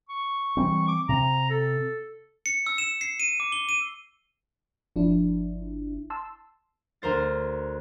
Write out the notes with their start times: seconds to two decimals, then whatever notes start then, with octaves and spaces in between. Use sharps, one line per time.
0.09 C#6
0.57 E3 G3 C4
0.88 D6
1.09 C3 A#5
1.50 A4
2.46 C#7
2.67 E6
2.78 E7
3.01 C7
3.20 D#7
3.40 D6
3.52 G7
3.69 D#7
4.96 G1 F3 D4 E4
6.10 A5 C6 E6
7.02 D2 A#4 C5 A6